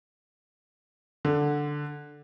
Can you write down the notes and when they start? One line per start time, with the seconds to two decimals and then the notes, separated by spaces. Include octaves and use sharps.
1.25 D3